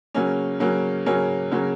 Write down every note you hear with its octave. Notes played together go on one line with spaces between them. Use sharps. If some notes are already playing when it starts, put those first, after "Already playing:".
C#3 F#3 A#3 C#4
C#3 F#3 A#3 C#4
C#3 F#3 A#3 C#4
C#3 F#3 A#3 C#4